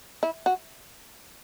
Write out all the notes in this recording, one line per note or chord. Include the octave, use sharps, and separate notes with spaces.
E4
F#4